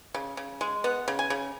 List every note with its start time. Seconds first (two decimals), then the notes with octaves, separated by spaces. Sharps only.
0.14 C#3
0.37 C#3
0.61 G#3
0.84 B3 F#5
1.08 C#3
1.19 G#5
1.30 C#3